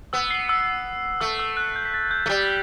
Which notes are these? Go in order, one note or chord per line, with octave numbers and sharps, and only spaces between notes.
B3 E6
C7
E6
A3 E6
E6
F#6
G6
B6
A6
G6
A3
G3